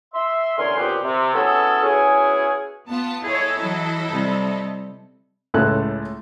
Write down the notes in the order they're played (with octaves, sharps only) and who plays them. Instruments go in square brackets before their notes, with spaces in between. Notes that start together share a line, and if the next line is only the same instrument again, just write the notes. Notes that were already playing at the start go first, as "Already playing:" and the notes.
[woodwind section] E5 C6
E2 D3 C#4 A#4 G#5 C6
D#2 A#2 B3 C4 G4
C3
F#3 B3 C#4 E4 G#4 A4
B3 C#4 E4 F#4 G#4
[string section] B3 F4 A5
[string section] E4 A4 D#5 [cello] G#4 C#5
[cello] E3 F#3
C3 G3
[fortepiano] C#2 A2 A4 F#6